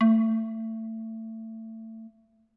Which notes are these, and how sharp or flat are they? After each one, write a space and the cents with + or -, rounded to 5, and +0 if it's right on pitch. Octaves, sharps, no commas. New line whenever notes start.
A3 +25